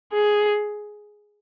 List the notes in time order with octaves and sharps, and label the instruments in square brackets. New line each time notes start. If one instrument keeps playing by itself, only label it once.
[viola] G#4